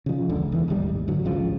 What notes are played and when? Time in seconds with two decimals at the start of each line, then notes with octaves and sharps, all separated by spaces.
0.06 C#3 F3
0.29 E1 C#2 D3
0.52 E2 E3
0.68 D1 G#1 D#2 G3
1.08 F#2 D3 F#3
1.25 G#1 C#2 C#3 F3